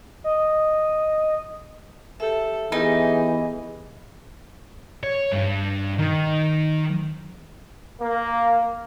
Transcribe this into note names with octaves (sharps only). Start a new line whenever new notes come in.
D#5
G4 A4 E5
E3 B3 D#4 G4 G#4
C#5
G2
D#3
A#3